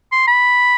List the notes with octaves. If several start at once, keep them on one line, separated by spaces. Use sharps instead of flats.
C6
B5